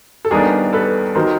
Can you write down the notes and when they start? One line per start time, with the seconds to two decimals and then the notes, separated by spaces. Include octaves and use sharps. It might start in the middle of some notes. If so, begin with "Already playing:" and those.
0.25 A4
0.31 D#2 D#3 G3 B3 D4 G#4 A#4
0.73 A4 B4
1.15 D#3 F#3 A#4 C5